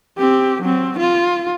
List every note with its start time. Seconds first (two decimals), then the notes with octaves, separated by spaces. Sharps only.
0.18 C4 G4
0.62 F#3 C4
0.98 F4